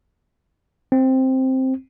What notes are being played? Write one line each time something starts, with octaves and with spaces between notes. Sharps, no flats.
C4